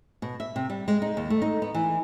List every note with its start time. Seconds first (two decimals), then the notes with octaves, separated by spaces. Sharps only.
0.22 B2
0.40 E5
0.56 C3
0.70 G3
0.88 G#3
1.02 D#4
1.17 D#2
1.30 A3
1.42 D#4
1.62 B3
1.74 E3